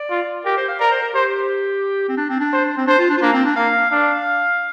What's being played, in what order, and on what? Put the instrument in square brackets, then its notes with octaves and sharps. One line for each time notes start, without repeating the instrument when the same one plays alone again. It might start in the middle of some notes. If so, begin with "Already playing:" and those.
Already playing: [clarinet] D5
[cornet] F4
[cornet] G4 [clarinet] A#4
[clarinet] C5
F5
[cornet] A#4 [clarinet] D5
[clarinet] C5
A#4
[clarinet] G4 [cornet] C5
[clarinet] C4
D4
C4
D4
[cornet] C5
[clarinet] C4
[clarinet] D4 [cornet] C5
[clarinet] F4
D4
F4
[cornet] A#3 [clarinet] D4
[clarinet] C4
D4
[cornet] A#3 [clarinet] F5
[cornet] D4 [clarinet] F5